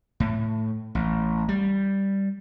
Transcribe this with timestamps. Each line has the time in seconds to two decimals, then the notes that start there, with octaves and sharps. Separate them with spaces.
0.20 A2
0.95 A1
1.49 G3